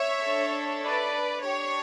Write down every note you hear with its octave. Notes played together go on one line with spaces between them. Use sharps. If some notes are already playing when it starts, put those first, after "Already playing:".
Already playing: C#5 E5
D4 A4
B4 D5
D4 G4 C#5